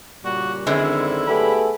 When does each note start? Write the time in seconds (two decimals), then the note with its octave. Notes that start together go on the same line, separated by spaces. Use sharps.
0.25 A#2 C#3 G3 F#4
0.67 F#2 D3 D#3 G#3 C4 E4
1.27 A3 B3 G4 G#4 B5